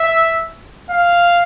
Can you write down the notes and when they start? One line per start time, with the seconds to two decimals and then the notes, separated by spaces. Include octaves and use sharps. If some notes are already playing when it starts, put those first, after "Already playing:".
Already playing: E5
0.90 F5